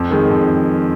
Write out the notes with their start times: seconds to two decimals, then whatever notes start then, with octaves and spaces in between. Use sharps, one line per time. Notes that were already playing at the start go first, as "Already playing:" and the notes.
Already playing: F2
0.11 D#3 G#3
0.30 F2